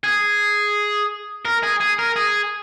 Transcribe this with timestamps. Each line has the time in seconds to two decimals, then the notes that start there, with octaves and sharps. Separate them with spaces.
0.04 G#4
1.45 A#4
1.63 G#4
1.80 G#4
1.99 A#4
2.16 G#4